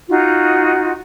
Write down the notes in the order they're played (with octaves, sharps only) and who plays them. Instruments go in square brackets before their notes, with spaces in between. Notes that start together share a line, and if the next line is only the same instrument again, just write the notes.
[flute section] D#4 F4 F#4